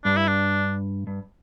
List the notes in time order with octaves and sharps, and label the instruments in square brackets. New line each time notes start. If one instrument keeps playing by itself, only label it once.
[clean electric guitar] G2 [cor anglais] D4
[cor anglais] E4
D4
[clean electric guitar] G2